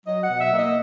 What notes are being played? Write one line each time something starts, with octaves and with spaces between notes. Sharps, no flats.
F#3 D#5
F#5
B2
E5
A#3
D#5